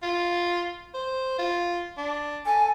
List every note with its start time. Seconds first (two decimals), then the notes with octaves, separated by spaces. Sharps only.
0.03 F4
0.94 C5
1.38 F4
1.97 D4
2.46 A4 G#5